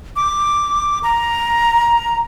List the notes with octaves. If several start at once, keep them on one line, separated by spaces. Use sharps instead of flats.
D6
A#5